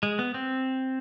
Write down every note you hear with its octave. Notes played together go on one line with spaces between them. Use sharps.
G#3
B3
C4